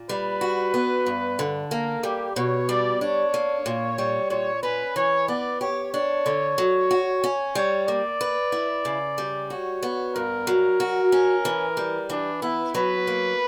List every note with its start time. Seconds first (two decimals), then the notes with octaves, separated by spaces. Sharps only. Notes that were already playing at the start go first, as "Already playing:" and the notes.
Already playing: A#2
0.09 G3 B4
0.41 F#4
0.74 B3
1.07 G2
1.39 D3
1.71 A#3 A#4
2.03 G3 G4
2.36 B2 C#5
2.69 G3 D5
3.01 D4 C#5
3.34 A#3
3.66 A#2
3.98 G3
4.30 A#2 C#5
4.63 C#4 B4
4.96 E3 C#5
5.28 B3 D5
5.61 G4 C#5
5.93 D4 C#5
6.26 D3
6.58 F#3
6.91 F#4
7.24 C#4
7.55 G3 C#5
7.88 A#3 D5
8.21 B4
8.52 E4
8.85 C#3
9.18 G3
9.50 F#4 C#5
9.83 B3
10.15 G2 A#4
10.47 F#3
10.80 F#4
11.12 C#4
11.45 E3
11.77 G3
12.09 E3 D4
12.42 B3 E4
12.75 F#3 B4
13.07 A#3